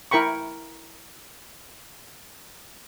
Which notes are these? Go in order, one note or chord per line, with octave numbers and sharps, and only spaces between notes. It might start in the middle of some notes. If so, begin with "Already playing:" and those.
E4 A#4 G5 B5 C#6